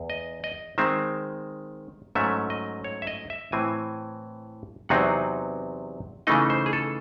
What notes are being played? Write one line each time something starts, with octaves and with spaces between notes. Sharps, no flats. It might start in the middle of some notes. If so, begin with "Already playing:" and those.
Already playing: E2
D#5
D#5
D#3 G#3 C4 E5
G#2 F#3 A3 C#4 E5
D#5
C#5
E5
D#5
E5
A2 E3 C4 G#5
E2 C3 F#3 C4 D#4 F#5
C#3 E3 A3 D#4 D#5
C5
G#4
A4